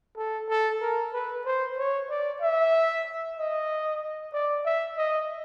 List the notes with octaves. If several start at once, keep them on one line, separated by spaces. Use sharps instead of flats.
A4
A4
A#4
B4
C5
C#5
D5
E5
D#5
D5
E5
D#5